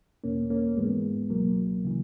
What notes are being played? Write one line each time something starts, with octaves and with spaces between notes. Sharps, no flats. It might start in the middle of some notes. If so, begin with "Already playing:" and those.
E2 B2 A#3 C#4
A#3 C#4
G#2 E3 G#3 B3
C#2 B2 F#3 A#3
C#3 E3